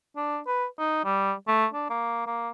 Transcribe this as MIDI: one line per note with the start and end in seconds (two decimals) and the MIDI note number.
0.16 0.39 62
0.47 0.66 71
0.79 1.00 63
1.05 1.33 55
1.48 1.66 57
1.74 1.89 62
1.90 2.26 58
2.26 2.50 58